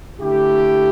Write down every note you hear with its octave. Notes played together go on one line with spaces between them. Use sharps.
D3 A3 E4 G4